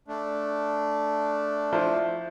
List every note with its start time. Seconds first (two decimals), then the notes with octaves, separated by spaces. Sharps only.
0.08 A3 D4
1.73 F3 E4 C5